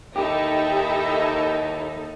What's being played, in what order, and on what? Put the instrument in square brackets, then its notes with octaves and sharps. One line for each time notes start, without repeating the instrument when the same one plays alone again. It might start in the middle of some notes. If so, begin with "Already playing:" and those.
[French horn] D#2 [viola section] D#4 A4 [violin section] E4 E5 A#5 [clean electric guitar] G4